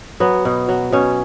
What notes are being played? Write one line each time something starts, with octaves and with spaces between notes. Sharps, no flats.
F#3 B3
B2
F#3
B2 C#4